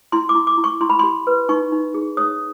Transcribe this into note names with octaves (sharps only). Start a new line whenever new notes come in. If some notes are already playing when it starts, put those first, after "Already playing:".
E4 C6
D6
E4
D6
E4
C#6
E4 C6
B5
G4 C6
B4
D#4 C#6
D#4
G#4
C#5 D#6